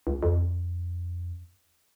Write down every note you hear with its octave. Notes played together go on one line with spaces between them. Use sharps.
C#2
F2